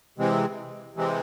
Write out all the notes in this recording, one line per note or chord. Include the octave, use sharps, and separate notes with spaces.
C3 E3 G#3 C4
C3 E3 G#3 C4